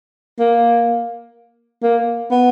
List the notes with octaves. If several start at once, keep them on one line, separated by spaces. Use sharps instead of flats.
A#3
A#3
B3